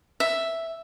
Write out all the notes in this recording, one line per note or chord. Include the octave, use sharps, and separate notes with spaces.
E5